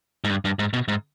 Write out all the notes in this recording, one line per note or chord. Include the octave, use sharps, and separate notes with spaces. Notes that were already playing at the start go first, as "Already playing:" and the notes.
G#2
G2
G2
G#2
B2
G#2